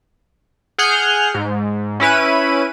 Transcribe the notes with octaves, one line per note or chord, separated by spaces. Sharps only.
G#4 F#5 F6 G6
G#2
C#4 E4 B4 D#7